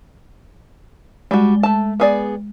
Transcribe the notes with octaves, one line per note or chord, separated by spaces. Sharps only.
G3 G#3 F#4
A3 A5
B3 G#4 D5